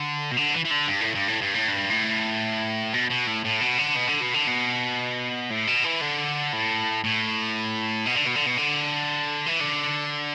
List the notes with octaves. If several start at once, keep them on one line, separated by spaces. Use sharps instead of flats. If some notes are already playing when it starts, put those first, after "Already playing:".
Already playing: D3
B2
D3
E3
E3
D3
G2
A2
G2
A2
G2
A2
G2
A2
B2
B2
A2
A2
B2
D3
B2
D3
B2
D3
B2
A2
B2
E3
D3
A2
A2
B2
D3
B2
D3
B2
D3
E3
D3